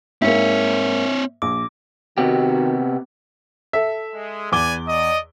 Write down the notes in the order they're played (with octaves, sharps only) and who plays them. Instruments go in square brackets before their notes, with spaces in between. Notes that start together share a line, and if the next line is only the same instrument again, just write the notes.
[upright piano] G#2 A#3 [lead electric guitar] C4 C#5 [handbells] E5
[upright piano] A#1 [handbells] D6
[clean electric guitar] C3 B3 G4 [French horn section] D#3 F#4
[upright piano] A4 E5
[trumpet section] G#3
[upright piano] E2 D6 G7 [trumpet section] B4 D5 G#5
[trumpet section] D5 D#5